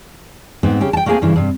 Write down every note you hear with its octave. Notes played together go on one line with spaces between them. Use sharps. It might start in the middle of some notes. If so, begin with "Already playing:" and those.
G#2 B3 C4
C#3 C#4 G4
G5 A5
A3 A#3 C4 G#4 A4 G#5
G2 C#3 E3
G2 C3